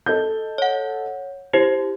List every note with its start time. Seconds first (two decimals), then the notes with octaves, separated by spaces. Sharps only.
0.06 A4 D#5 G6
0.58 C#5 F#5
1.53 E4 G4 C5